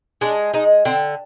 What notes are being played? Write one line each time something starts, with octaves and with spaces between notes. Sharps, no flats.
G#3 D4
G#3 D#4
D3 C4